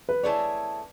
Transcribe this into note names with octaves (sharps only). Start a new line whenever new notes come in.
B4
A3 E4 G#4 C#5 D5